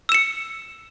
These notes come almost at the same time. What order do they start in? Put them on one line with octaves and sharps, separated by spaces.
E6 E7 C#7